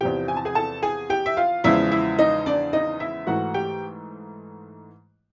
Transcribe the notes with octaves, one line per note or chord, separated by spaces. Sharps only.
E2 C3 F3 G4 G5
G#5
A5
G#4 G#5
A4 A5
G#4 G#5
G4 G5
E5
F4 F5
E2 C#3 F3 G#3 E4 E5
E4 E5
D#4 D#5
D4 D5
D#4 D#5
E4 E5
G#2 E3 A3 F#4 F#5
G4 G5